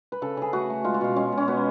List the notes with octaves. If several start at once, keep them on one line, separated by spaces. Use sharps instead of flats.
B4
C#3 A4
C#3 G#4
A3 F#4
A3
G#3 F4
F#4
B2 F4
G#3 C#4
B2
C#4
B2 B3